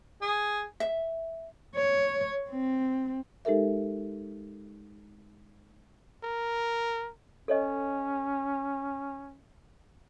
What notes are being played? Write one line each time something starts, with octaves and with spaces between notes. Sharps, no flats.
G#4
E5
C#5
C4
G#3 D#4 G4 A4 A#4 E5
A#4
C#4 A4 C#5 D#5